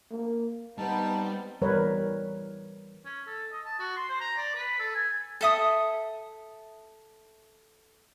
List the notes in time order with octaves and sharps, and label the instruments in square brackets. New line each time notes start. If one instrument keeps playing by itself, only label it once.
[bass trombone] A#3
[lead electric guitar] G3 [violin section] B3 C4 [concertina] D#4 A5
[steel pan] E3 G3 A#4 B4 C#5
[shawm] C#4
A4
D#5
A5
F#4
C6
C5
A#5
D5
B4
A4
G#5
[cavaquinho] A4 E5 D#6